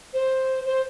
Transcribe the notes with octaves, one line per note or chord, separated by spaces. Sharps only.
C5
C5